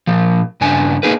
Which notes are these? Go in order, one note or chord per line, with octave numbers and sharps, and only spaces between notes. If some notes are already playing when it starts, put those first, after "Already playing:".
A#2 F3
G2 C#3 D4 G#5
A#3 D#4 G#4 A#4 B4